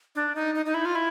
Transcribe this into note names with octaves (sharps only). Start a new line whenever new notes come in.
D4
D#4
D#4
D#4
E4
F4
E4